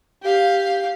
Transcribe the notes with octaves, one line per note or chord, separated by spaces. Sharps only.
G4 F5